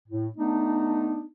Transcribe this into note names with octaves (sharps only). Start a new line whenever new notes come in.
A2
A3 B3 D4 D#4